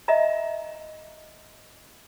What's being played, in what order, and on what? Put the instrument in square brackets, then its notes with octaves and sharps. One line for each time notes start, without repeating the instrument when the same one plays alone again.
[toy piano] D#5 E5 A#5